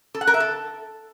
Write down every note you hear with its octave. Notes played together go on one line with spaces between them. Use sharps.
A4
F#5
A#4
E5
A4